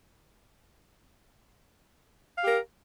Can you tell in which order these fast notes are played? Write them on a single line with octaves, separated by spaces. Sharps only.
F5 G4 A#4